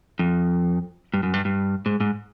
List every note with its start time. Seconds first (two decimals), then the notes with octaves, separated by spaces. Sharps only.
0.19 F2
1.14 G2
1.23 F#2
1.34 G2
1.45 G2
1.86 G#2
2.00 G#2